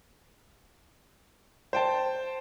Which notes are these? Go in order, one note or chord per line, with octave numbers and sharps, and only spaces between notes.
C5 G5 A5